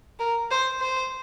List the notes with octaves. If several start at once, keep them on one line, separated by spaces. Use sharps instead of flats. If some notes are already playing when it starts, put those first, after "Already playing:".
A#4
C5
C5